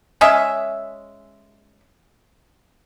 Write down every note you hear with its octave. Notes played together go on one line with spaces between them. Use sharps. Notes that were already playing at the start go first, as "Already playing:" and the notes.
G#3 C#4 D#5 E5